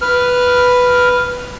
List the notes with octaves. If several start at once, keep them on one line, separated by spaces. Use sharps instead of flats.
B4 F6